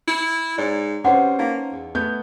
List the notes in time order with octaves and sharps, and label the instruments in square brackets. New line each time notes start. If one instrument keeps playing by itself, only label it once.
[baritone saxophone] E4
[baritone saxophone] G#2 [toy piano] C#5 D5
[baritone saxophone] C3 [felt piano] C#4 B4 C5 [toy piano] F#4 F#5 D6
[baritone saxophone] A#3 [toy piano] D#4 F5
[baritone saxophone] E2
[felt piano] A3 B3 G6